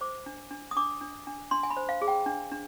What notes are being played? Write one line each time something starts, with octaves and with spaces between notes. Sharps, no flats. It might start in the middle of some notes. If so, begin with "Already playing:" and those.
C5 D6
D4
D4
D#6
D4 D6
D4
D4
D4 C6
G#5
B5
C5
F5
G#4
G5
D4
D4